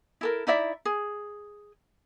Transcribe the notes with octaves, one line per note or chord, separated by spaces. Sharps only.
E4 A4 A#4
D#4 E4 D5 E5
G#4